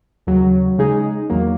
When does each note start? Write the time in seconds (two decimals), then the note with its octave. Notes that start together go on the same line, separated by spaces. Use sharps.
0.27 D#2 C#3 F#3
0.78 C#3 G#3 D#4 G#4
1.30 E2 D#3 F#3 A#3